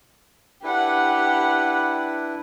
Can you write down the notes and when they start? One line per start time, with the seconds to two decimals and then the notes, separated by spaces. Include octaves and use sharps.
0.63 D4 E4 G4 B4 F#5